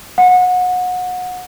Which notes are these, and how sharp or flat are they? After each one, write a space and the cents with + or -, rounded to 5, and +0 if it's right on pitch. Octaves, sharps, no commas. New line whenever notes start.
F#5 -25